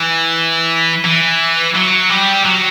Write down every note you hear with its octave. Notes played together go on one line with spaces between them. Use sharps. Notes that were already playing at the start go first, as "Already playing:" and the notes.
Already playing: E3
E3
F#3
G3
F#3